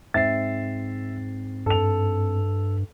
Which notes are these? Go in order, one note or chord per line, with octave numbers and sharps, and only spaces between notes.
G#2 C4 E5 A6 C7
G2 A4 F7